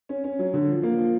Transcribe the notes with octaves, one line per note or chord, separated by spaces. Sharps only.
C#4
C#4
F#3
D3
F3
A#3
F3